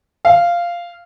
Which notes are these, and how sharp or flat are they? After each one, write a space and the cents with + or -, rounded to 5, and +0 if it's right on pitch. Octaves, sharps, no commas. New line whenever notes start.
F5 -10